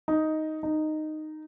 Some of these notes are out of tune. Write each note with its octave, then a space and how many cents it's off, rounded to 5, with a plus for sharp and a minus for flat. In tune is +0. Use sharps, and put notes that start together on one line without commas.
D#4 +5
D#4 -10